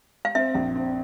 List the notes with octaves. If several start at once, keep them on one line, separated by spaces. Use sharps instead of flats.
F5
C4 E5
A#1
C4